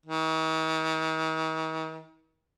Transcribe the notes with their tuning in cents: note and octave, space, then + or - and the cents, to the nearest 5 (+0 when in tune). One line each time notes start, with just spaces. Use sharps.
D#3 +45